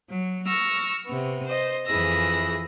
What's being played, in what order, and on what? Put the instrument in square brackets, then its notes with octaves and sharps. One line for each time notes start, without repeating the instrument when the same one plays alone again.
[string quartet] F#3
C#6 E6 F6 A#6
C3 B3
C5 D#5
F2 E3 G#4 B5 E6 A#6